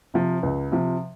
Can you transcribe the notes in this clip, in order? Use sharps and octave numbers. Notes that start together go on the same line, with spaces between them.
C3 F3
C#2
C3 F3